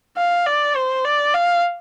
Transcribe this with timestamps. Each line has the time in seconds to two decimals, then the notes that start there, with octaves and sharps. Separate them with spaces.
0.17 F5
0.46 D5
0.76 C5
1.05 D5
1.34 F5